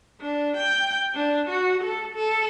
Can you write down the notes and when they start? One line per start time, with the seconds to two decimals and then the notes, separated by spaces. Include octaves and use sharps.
0.21 D4
0.57 G5
1.15 D4
1.49 F#4
1.84 A4
2.15 A4